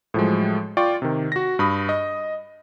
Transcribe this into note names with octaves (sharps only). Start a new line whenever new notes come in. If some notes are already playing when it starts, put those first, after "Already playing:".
A2 F3 F#3 G#3
F4 D5 G5 C#6
C3 D#3
F#4 A#6
G2 B5 D#6
D#5